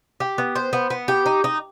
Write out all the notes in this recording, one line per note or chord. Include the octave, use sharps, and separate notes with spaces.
G4
B3
C5
B3
B3
G4
D#4
D#4